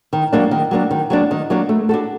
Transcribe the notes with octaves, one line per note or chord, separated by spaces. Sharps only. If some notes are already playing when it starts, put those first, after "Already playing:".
D#3
F#3 A#3 D4
D#3
F#3 A#3 D4
D#3
F#3 A#3 D4
D#3
F#3 A#3 D4
A3
D4 F#4 A4